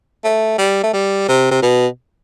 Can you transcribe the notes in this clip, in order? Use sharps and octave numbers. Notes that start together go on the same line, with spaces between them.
A3
G3
A3
G3
C3
C3
B2